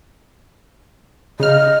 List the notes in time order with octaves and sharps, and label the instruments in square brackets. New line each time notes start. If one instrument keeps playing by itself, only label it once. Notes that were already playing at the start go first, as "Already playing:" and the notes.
[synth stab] C#3 F6 [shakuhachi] D#5